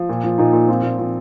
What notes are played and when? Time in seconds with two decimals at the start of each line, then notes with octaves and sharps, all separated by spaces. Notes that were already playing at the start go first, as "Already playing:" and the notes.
Already playing: F3
0.09 A#2
0.24 F3
0.38 A#2 D#4
0.53 A#2
0.68 F3 C4
0.83 A#2
0.99 F3 C4